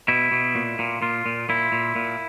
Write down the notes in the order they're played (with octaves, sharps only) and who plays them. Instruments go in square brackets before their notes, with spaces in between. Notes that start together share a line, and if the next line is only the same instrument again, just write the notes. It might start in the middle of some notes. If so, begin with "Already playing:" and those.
[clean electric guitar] B2 E4
B2
A#2
A#2
A#2 F4
A#2
A#2 E4
A#2
A#2